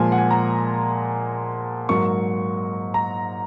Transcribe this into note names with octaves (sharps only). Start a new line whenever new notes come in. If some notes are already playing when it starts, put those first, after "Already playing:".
Already playing: A#2 F3 G#3 G#5
F#5
G#5
A#5
G#2 F#3 A#3 C#6
A#5